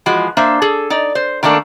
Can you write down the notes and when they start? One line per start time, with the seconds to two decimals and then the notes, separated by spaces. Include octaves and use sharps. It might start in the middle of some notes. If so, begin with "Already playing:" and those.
0.06 E3 F3 G#3 F#4
0.37 A#3 D4 C5 E5
0.62 G#4 A4
0.90 D#4 D5
1.15 C5
1.43 D#3 A3 A#3 D4 A4